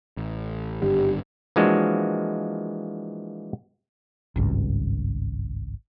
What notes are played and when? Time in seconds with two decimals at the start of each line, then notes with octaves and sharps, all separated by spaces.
0.17 A1
0.82 G#1 G2 D3 G4
1.56 E3 F3 G#3 A#3 D4 F#4
4.36 G#1 C#2 G2